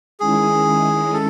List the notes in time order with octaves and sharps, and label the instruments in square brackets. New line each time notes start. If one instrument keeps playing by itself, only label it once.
[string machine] D#3 G#3 C#4 E4 [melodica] G#4
[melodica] A4